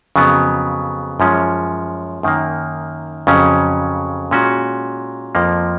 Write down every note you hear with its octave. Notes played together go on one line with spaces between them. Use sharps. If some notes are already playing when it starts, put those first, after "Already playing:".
F2 C#3 F#3 B3
F#2 F3 G#3 C#4
F#2 D#3 A#3
F2 C#3 F#3 C#4
A#2 G#3 C#4 F#4
F2 F3 A#3